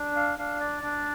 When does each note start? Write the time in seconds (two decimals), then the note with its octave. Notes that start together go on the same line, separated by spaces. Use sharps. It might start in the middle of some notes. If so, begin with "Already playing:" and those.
Already playing: D4
0.16 F5
0.38 D4 F5
0.60 D5
0.83 D4